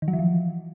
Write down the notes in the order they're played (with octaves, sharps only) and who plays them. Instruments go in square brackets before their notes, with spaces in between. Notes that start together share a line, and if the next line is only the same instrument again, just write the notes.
[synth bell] D#3
F#3
E3
F3